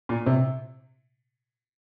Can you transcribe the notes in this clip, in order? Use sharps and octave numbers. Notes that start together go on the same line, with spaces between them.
A#2
C3